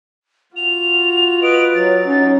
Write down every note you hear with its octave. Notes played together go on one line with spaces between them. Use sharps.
F4 F#4 F7
B4 D#5 D7
F#3 A6
C#4 D#4